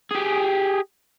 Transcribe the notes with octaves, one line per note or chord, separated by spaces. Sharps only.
G4 G#4